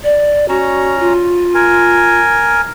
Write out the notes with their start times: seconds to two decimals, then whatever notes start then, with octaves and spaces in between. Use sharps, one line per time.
0.04 D5
0.49 C#4 F#4 A#5
0.99 F4
1.55 A#4 G#5